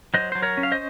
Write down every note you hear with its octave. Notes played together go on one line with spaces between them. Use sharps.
F#3 C5 D#5
F#3 C5
A#4 C#5
C#4
F5
C5 D#5